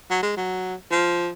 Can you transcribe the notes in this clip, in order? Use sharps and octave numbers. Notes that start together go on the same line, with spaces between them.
F#3
G#3
F#3
F3